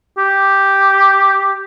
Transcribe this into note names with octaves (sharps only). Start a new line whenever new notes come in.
G4